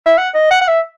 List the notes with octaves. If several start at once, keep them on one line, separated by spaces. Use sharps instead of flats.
E5
F#5
D#5
F#5
F#5
E5